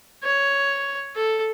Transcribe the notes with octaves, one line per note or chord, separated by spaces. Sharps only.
C#5
A4